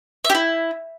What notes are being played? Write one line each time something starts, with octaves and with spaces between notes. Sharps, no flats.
E5
G4
E4